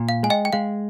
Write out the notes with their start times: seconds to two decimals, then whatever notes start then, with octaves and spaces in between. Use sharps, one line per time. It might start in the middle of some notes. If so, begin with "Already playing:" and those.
Already playing: A#2
0.09 F5
0.23 G#3 G#5
0.30 D#5 G5
0.45 G5
0.53 G#3 F5